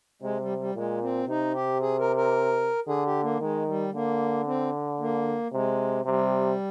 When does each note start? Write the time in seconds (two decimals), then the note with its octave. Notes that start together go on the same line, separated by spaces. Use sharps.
0.22 C3 G#3
0.40 G3
0.58 G3
0.75 A#2 G#3
1.01 C4
1.28 C3 D#4
1.54 G4
1.81 G#4
1.99 A#4
2.16 A#4
2.88 D3 G#4
3.05 G4
3.22 A#3
3.40 D#3 G#3
3.66 G3
3.94 D3 A#3
4.46 C4
5.00 A#3
5.52 C3 G#3
6.06 C3 G3